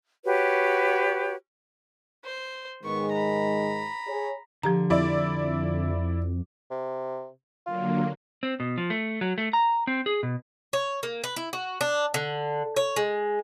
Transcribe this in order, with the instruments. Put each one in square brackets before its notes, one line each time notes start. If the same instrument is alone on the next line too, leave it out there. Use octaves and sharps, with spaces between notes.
[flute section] F#4 G4 B4 C#5
[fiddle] C5
[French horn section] G#2 D#3 G#3 [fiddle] B3 C#6
[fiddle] A#5 B5
[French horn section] G#4 C#5
[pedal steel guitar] D3 [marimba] F3 G4 A#5
[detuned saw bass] F2 [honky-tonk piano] E4 D5
[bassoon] C3
[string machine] D3 F#3 A#3 [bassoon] F4
[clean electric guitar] C4
B2
F3
A3
F#3
A3
A#5
C4
G#4
B2
[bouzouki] C#5
A#3
B4
E4
F#4
D4
D3
C#5
G#3